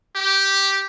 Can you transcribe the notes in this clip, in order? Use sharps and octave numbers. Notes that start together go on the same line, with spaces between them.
G4